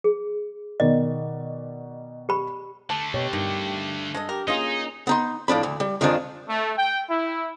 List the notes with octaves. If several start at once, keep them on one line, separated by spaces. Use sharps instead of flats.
G#4
B2 D#3 D5 D#5
G4 B5
D3 A3 A5
B2 G4 C#5
G2 D#3
G#3 A4 D#5
G4 A#4
A#3 C#4 D#4 F4 G#4 D#5
B3 D#4 C6
A2 F3 D4 B5
D2
G3
F2 D#3 F3 G#3 D4
A3
G5
E4